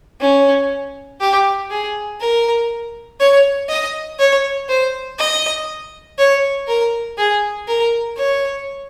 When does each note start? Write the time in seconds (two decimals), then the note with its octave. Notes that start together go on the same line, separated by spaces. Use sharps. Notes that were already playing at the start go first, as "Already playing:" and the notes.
0.21 C#4
1.20 G4
1.71 G#4
2.20 A#4
3.20 C#5
3.69 D#5
4.19 C#5
4.69 C5
5.19 D#5
6.18 C#5
6.67 A#4
7.18 G#4
7.68 A#4
8.17 C#5